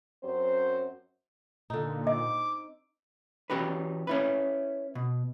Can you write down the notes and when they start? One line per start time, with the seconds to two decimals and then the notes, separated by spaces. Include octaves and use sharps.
0.24 F#2 F#3 C4 C5
1.70 A#2 D3 D#4
2.07 C4 D#5 D6
3.50 E3 C#4 F#4 G4 B4
4.07 C#4 E4 B4
4.95 B2